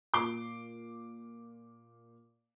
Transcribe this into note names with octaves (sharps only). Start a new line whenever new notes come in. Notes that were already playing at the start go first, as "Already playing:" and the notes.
A#2 D6 C7 G7